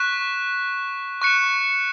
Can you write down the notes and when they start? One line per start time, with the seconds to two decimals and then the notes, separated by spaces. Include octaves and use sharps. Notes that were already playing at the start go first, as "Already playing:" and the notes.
Already playing: C#6 F#6 B6 E7
1.22 C#6 F#6 C#7 E7